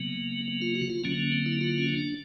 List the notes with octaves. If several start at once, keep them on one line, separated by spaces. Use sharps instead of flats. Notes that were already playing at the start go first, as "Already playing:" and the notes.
Already playing: C#3 F#3 A#3 B3
B3
F4
F#4
F4
D3 F#3 A#3 C#4
C#4
C4
E4
F4
C#4
D4